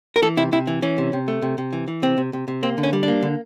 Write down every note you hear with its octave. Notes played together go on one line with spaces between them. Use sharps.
A#4
E3 A4
C3 E4
C3 E4
E3
E3 C#4
C3
C3
A3
C3
C3
E3
E3
C3 C4
C3
C3
C3
A#3 C4
D3
C#4
G3
A#3 D4
D3